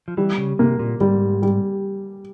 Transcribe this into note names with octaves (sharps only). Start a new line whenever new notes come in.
F3
E3 G3
C#3
C3 A#3
A#2
G#2 G3
G3